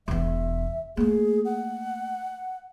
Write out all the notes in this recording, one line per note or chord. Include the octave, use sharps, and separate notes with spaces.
E1 E2 E5
A3 A#3 G#4
F#5